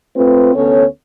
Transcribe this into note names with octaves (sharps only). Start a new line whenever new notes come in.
A3 C4 F4 B4
D2 B3 C#4 A4 C#5